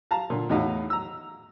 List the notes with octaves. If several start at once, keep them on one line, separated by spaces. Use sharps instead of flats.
F5 A5 A#5
A#2 D3
E2 A2 D#4 F#4 F5
A#5 E6